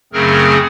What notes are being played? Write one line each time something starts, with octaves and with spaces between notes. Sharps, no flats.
F#2 C#3 F#3 A3 C4 G#4 A#4